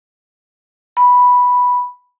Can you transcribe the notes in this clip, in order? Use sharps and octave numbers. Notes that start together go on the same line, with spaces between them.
B5